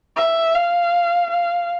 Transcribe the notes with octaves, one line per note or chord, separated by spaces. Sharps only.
E5
F5
F5